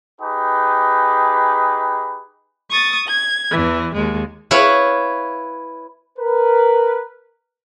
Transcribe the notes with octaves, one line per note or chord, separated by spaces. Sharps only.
D#4 G4 G#4 B4
C#6 D#6 A6
G#6
E2 E3
D#2 G#3
E4 B4 C#5 F5
A#4 B4